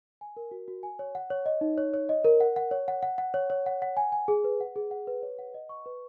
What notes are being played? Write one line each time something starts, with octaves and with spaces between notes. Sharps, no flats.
G#5
A#4
F#4
F#4
G#5
C#5
F#5
C#5
D#5
D#4
C#5
C#5
D#5
A#4
F#5
F#5
C#5
F#5
F#5
F#5
C#5
C#5
F#5
F#5
G#5
G#5
G#4
B4
F#5
G#4
F#5
B4
C#5
F#5
D#5
C#6
B4